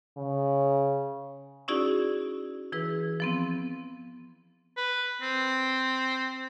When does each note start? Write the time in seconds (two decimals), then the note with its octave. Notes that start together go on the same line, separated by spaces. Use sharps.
0.18 C#3
1.68 C#4 D#4 E4 F#4 G#4 D5
2.72 E3 E4 G#4 B4
3.20 F3 B3 C4
4.77 B4
5.22 C4